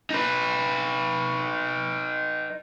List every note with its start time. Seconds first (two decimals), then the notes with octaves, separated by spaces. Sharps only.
0.10 D#4 B4